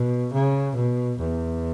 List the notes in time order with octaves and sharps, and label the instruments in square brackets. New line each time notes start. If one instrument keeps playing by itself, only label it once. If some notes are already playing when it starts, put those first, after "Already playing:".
Already playing: [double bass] B2
C#3
B2
E2